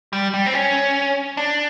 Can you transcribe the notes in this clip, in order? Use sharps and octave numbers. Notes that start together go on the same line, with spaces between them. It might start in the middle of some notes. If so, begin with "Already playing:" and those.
G3
G3
C4
C#4
D4